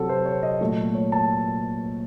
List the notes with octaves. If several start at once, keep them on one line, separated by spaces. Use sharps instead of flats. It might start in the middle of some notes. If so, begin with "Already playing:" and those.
Already playing: C3 F#3 C4 F#4 A4
C5
C#5
D#5
A#2 F#3 A3
C#5
A5